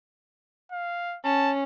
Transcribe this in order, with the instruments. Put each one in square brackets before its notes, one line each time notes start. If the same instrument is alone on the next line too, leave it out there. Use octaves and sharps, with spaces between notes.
[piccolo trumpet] F5
[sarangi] C#4 [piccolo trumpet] A5